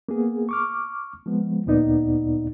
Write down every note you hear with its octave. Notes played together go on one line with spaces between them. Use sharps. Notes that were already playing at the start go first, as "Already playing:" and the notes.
A#3 B3 G#4
C#6 D6 F6
F3 G#3 B3
D2 A#2 B3 D#4 D5